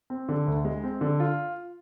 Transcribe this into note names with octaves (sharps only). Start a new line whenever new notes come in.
C4
D3
D2
G#3
C4
D3
F4